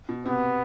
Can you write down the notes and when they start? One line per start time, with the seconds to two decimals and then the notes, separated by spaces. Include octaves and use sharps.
0.09 B2
0.25 C3 B3